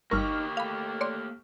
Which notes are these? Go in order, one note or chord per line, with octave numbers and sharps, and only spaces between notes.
G1 A#3 D#4 G4 A#4 C#6 F6
A3 F5 B5
C#5 D5 C6